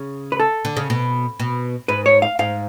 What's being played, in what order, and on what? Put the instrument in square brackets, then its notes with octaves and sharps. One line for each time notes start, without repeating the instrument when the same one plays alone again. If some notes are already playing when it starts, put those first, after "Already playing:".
Already playing: [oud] C#3
[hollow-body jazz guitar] B4
A4
[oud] D3
C#3
B2
B2
[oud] G#2 [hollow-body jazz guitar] B4
[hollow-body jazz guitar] C#5
F5
[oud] G#2 [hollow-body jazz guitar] F5